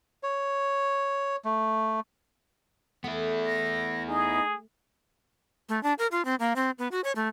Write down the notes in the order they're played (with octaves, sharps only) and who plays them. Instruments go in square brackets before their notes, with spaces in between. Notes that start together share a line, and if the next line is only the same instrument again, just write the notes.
[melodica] C#5
A3
[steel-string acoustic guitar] A3 [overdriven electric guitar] B3 E4
[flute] A#6
[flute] D#4 [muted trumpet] G#4
[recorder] A3
D4
A#4
F4
C4
A#3
C4
B3
F#4
C#5
A3